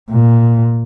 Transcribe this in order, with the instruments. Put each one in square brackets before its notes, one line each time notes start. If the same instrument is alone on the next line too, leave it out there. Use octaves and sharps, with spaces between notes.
[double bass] A#2